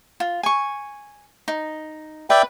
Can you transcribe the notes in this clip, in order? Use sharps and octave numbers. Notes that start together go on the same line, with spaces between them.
F4
G#5 C#6
D#4
B4 D5 E5 G5